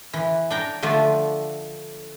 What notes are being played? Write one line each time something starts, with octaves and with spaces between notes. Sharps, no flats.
E3
D4 G5 A#5
D3 F3 A3 D4